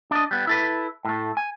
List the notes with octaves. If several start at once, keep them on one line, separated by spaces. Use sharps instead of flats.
D4 D#5
G3 B3
E4 A4 B4
A2 A3
G#5